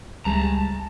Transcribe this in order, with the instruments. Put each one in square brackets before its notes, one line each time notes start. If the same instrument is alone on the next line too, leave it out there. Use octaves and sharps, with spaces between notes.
[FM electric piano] C#2 G3 G#3 [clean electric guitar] A5 A#5